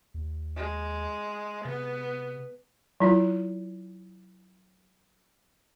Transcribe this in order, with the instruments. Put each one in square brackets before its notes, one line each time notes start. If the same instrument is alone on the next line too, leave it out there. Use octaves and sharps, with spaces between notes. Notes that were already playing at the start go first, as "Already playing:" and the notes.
[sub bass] D#2
[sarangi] G#3
[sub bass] C3 [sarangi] B3
[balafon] F#3 E4 F4